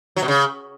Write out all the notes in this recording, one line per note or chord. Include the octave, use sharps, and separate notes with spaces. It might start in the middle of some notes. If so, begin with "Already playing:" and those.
F#3
B2
C#3